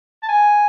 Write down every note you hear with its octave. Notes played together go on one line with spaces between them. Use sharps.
A5
G#5